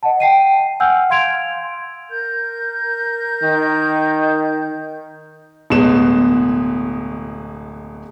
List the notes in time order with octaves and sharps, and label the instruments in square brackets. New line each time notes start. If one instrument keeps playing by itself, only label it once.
[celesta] D#5 F#5 A5
G5 C7 D#7
F#5 G#5 E6 F6 G6
F5 C6 G#6 D7 F7
[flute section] A#4 G6
[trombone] D#3
[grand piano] D1 B2 G#3 B3 E7